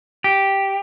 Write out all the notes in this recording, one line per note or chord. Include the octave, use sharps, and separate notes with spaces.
G4